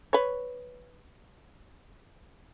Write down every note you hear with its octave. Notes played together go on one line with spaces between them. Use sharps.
B4 C#5